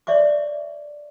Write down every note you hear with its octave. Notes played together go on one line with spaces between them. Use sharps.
C#5 D5 E5 C#6 D6